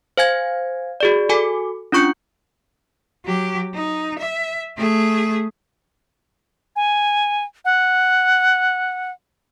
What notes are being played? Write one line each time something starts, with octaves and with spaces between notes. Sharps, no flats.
C5 F5 G#5 G#6
F#4 G#4 D5
F#4 A4 G#5 D6
C#4 D4 F4 C#6 G6 C#7
F#3 G4
D#4
E5
A3 G#4
G#5
F#5